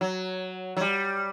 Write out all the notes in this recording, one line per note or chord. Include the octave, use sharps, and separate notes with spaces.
F#3
F#3
G3